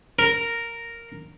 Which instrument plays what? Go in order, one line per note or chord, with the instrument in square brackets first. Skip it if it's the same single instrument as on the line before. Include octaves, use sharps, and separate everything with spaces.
[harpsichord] A#4